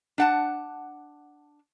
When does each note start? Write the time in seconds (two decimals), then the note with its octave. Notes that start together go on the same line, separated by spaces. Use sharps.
0.18 D4 F#5 A5